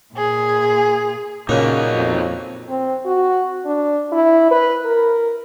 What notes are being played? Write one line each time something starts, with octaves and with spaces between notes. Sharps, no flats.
A#2 G#4
A#2 C#3 A#3 C#4 D#4 F#4 D#5
F2
C4
F#4
D4
E4
B4
A#4